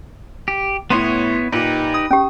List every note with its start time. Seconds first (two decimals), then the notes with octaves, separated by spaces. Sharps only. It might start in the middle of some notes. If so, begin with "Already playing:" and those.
0.48 G4
0.90 A2 B3 E4 C#5 C6 D#7
1.52 A#2 D#4 G4 B4
1.94 D#6
2.11 C#4 G4